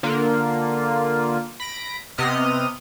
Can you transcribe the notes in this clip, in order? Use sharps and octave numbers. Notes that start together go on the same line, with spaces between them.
D3 A#3 F4
B5 A#6 D7
C3 B3 D#5 D#6 F6